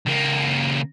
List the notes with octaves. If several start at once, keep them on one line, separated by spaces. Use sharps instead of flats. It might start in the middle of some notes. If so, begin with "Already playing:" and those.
C#2 A#3